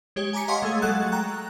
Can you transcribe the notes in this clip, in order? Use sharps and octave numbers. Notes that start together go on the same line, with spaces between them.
G#3 G4 C#5
G#5 A#5 D6 B6 C#7
D#5 F5 F#5 G#5 C6 C#6
G#3 A3 G#4
F#3 G#3 A4 F#5 F#6
G5 A#5 F#6